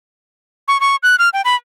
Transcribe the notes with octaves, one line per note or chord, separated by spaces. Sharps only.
C#6
C#6
F#6
F6
G5
B5